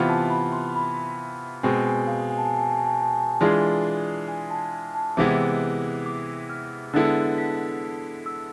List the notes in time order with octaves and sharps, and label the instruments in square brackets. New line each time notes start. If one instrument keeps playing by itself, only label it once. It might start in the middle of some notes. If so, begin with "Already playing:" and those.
Already playing: [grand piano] C3 E3 B3 F4 [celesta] B5
[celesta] A5
B5
C6
B5
[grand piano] B2 G#3 C4 [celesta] G#5
[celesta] G#5
F5
G#5
A5
G#5
A5
G#5
A5
G#5
A5
G#5
A5
G#5
A5
G#5
A5
[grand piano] E3 G#3 D4 F4 G#4 [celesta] G#5
[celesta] G#5
A5
A5
[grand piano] C3 E3 G#3 B3 E4 [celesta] D6
[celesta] D6
F6
[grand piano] D3 G#3 B3 E4 A4 [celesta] A6
[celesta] B6
E6